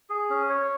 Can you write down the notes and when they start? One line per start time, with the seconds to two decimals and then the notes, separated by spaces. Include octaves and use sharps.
0.09 G#4
0.30 C#4
0.49 C#5